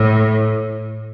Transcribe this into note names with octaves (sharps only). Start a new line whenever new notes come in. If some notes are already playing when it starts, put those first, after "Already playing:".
Already playing: A2